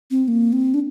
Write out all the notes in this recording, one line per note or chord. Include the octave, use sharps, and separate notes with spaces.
C4
A#3
C4
D4